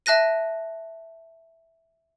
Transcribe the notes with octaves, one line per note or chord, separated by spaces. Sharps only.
E5 A5 F#6 A#6 D#7